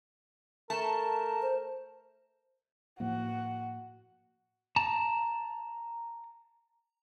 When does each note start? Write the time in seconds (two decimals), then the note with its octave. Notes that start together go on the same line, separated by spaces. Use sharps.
0.70 A3 A#4 A5
1.42 C5
3.00 A2 F3 A#3 F#4
4.76 A5 A#5